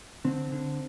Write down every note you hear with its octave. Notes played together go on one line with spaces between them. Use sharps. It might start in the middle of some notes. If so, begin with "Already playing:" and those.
D3 C4
D3